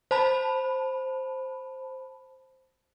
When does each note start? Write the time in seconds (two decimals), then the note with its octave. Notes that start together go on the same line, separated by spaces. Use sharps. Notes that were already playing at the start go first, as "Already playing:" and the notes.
0.11 C5 A5 B5